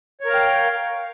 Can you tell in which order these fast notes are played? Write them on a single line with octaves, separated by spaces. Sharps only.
C#5 A#4 F5 G5